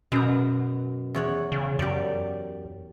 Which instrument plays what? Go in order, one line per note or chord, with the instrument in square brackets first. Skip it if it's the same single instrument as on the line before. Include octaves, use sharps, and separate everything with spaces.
[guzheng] F#2 A#5 [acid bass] B2
[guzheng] E2 C#5 F#5
[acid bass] C#3
[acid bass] F#2 [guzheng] G4 D5